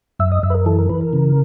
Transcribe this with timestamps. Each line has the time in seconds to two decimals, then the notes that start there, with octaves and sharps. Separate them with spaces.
0.19 F#2 E5
0.32 D#5
0.43 F#2 E5
0.50 B4
0.54 A#4
0.66 E3 A4
0.79 A#4
0.89 E3 B4
1.01 A#4
1.13 C#3